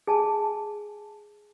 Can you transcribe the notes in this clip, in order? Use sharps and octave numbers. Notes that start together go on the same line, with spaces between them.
G#4 G#5 A5